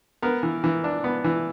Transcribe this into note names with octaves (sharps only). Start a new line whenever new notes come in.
B3 A#4
E3
E3
D4
B3
E3